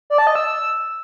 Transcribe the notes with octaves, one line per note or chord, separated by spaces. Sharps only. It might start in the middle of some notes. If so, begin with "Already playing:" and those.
D5
A5
D#5
E6